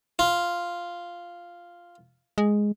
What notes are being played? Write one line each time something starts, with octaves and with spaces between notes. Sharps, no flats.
F4
G#3